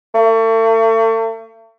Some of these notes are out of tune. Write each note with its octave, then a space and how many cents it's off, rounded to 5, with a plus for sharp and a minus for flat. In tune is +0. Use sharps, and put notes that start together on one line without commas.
A3 +40